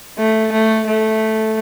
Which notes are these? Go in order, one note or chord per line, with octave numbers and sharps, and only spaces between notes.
A3
A3
A3